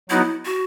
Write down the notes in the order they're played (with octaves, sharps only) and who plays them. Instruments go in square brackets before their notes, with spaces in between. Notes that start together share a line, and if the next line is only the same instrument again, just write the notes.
[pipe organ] F#3 B3 D#4 F#4 [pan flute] E4
[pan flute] F#4